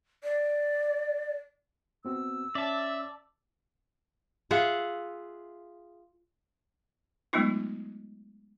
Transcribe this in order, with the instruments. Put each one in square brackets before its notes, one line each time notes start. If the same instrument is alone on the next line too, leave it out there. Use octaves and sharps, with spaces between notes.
[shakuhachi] D5
[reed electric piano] B3 C4 F#4 [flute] E6
[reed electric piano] C#4 [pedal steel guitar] D5 A5 [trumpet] E5
[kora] F4 G#4 E5 F#5
[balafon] F#3 G#3 A3 B3 D#4 F4